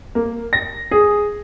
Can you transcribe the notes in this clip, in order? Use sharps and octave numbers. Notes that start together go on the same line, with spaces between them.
A#3
A#6
G#4